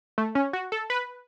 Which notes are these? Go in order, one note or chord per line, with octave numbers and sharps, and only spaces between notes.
A3
C#4
F#4
A4
B4